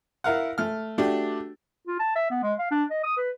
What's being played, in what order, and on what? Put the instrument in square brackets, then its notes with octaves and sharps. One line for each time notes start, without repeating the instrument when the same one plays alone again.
[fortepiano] E4 A#4 F5 F#5
A3 F6
A3 D4 F#4 G4
[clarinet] F4
A5
E5
B3
G#3
F5
D4
D#5
D#6
B4